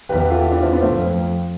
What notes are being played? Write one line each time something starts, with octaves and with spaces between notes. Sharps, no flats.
E2 G4 B4
G4 B4
F4 A4
E4 G4
D4 F4
C4 E4
B3 D4
A3 C4
F2